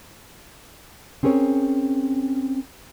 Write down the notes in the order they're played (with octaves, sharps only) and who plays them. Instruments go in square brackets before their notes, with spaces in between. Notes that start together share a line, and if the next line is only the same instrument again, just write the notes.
[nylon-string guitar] C4 C#4 G#4 A#4 C#5